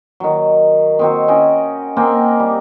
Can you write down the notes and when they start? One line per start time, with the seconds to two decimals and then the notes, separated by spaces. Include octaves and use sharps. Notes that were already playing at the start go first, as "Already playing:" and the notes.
0.20 D#3 F#3
0.99 D#3 C4 F#4
1.28 C#4 F#4 D#5 G5
1.97 A#3 C4 G5 G#5
2.40 G3